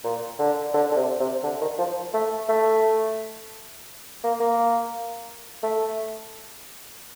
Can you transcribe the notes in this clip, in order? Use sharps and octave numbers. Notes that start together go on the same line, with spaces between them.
A#2
D3
D3
D3
C3
C3
D3
D#3
F3
A3
A3
A#3
A#3
A3